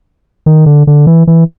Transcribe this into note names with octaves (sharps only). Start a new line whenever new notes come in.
D#3
D3
D3
E3
E3